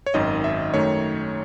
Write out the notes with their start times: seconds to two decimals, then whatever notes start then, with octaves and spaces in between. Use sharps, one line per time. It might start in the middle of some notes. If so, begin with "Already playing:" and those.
0.06 C#5
0.14 G#1 F#2 D#3 D#5
0.44 E5
0.74 F#2 D#3 A3 C#5